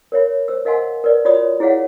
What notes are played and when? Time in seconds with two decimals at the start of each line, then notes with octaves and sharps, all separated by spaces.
0.12 A#4 C#5 E5 B5
0.48 C5 E6
0.65 A#4 D#5 F5 F#5 G#5 C6
1.04 A#4 B4 D5
1.25 F4 F#4 C#5 D5 B5 D#6
1.60 E4 G#4 C#5 F5 F#5